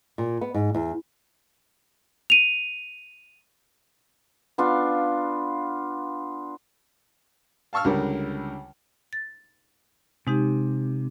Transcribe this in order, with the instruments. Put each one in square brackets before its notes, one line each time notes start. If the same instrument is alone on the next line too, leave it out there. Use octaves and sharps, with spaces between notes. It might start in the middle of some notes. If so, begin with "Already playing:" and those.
[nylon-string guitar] A#2
B3
G#2
E2
[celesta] D#7 F7
[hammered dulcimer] B3 D4 F4 F5
[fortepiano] F5 A5 C#6 E6 F6
C#2 D3 G3 A#4
[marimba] A6
[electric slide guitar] C3 [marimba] G#3 D#4 G4